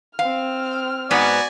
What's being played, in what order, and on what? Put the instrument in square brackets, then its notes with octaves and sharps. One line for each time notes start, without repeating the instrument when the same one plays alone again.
[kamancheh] C4 F6 [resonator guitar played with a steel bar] F5
[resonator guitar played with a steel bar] G#2 B3 [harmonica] F#4 D5 G#5